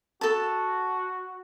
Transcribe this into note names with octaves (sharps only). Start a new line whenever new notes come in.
F#4 A4 A5